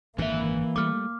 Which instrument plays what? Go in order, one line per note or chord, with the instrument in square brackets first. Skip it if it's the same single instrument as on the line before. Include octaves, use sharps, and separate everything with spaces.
[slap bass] G#1 F#2 D3 [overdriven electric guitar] E3 E5 [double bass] A#3
[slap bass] G3 A3 [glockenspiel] D6 F6